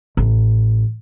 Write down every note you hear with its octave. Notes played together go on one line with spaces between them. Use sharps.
A1